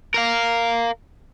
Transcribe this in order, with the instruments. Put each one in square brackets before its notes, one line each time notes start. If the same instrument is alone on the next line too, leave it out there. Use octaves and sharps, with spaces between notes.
[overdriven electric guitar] A#4 F5